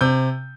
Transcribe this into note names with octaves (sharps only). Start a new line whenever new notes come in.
C3 G6